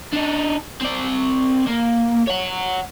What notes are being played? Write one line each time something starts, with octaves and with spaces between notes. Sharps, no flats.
D4 D#4
C4 D5
A#3
C#5 F#5